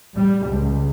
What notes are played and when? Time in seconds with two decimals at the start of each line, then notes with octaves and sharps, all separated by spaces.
0.16 G3
0.48 C#2